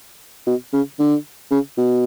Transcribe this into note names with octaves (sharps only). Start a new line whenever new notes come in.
B2
C#3
D3
C#3
B2